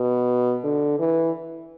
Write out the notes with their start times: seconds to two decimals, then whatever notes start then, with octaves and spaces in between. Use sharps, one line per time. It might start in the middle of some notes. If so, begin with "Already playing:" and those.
Already playing: B2
0.64 D3
0.99 E3